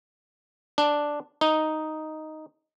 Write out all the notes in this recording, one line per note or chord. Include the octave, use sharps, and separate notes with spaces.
D4
D#4